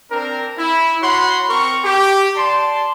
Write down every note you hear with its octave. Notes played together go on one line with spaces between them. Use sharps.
C4 D4 A#4
E4
F#4 C#5 F#5 B5 C6
C4 A#4 C#6
G4
D5 A5 C6